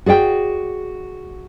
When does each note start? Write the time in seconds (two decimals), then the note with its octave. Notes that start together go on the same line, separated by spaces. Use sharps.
0.06 F#4 G#4 D5 G5